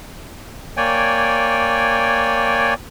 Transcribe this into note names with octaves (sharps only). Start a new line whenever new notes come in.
A#3 C#5 D5 G5 G#5